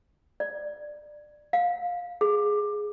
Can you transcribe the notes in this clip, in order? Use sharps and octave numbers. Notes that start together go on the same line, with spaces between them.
D5
F5
G#4